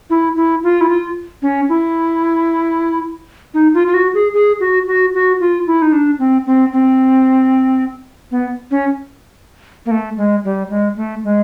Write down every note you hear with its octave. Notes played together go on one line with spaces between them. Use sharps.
E4
E4
F4
E4
F4
C#4
E4
D#4
F4
F4
F#4
G#4
G#4
F#4
F#4
F#4
F4
E4
D#4
D4
C4
C4
C4
B3
C#4
A#3
A3
G#3
G3
G#3
A3
G#3